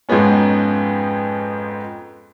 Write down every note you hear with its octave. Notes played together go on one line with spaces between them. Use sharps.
F2 G#2 F3 G#3 B3 C#4